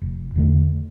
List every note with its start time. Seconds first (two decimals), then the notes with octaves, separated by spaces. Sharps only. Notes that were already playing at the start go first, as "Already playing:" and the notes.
0.02 F1
0.35 E2 D3 A3